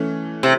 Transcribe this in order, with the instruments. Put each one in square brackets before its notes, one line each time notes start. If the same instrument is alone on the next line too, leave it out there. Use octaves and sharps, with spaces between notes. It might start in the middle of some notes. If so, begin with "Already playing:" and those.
Already playing: [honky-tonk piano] E3 A3 C#4
[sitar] C3